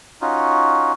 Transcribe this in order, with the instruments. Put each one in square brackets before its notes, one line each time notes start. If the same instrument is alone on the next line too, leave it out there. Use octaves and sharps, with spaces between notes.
[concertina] C#4 D#4 F4 F#4